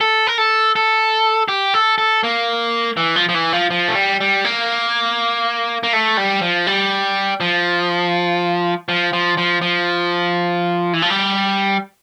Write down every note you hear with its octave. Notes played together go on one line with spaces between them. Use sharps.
A4
A#4
A4
A4
G4
A4
A4
A#3
E3
F3
F3
E3
F3
F3
A3
G3
G3
A#3
A#3
A3
G3
F3
G3
F3
F3
F3
F3
F3
E3
F3
G3